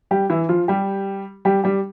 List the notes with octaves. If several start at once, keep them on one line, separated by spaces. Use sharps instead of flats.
G3 G4
E3 E4
F3 F4
G3 G4
G3 G4
G3 G4